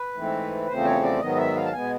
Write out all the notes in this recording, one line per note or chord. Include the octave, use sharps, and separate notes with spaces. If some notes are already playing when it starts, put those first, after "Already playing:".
Already playing: B4
G#2 E3 A3 C4
E2 C#3 F3 A3 C4 C5
C#5
D5
G#2 D#3 F#3 B3 D#5
E5
F5
A5
B2 G#3 B3 G#5